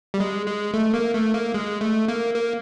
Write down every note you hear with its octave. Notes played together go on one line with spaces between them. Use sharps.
G3
G#3
G#3
A3
A#3
A3
A#3
G#3
A3
A#3
A#3